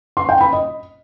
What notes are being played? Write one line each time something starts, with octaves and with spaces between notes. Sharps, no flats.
C6
G5
B5
D#5